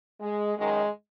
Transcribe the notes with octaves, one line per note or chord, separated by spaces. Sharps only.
G#3
F#2 D#3 G#3